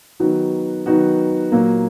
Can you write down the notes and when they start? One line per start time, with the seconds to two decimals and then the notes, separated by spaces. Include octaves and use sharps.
0.20 D#3 F#3 B3 D#4 F#4
0.86 D#3 F#3 B3 D#4 F#4
1.52 A#2 F#3 A#3